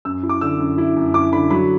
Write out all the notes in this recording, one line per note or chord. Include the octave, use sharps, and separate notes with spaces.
F#2 E6
E4
D6
D3 E6
F#2
E4
F#2
E4 D6
D3 B5
F#3 B5